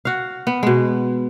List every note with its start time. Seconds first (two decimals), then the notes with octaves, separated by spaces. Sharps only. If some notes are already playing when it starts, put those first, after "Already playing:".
0.05 F#4 F5
0.47 B3
0.63 B2 G#3